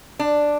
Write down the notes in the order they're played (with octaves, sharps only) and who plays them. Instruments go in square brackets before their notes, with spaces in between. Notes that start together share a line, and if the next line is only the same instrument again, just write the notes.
[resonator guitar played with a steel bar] D4